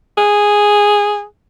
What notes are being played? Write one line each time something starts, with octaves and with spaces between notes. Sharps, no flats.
G#4